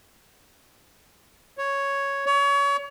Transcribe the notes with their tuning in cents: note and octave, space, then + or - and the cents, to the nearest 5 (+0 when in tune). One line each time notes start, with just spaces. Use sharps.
C#5 +0
C#5 +30